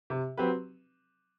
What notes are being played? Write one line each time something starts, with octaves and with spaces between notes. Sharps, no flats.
C3
F#3 C4 G4 B4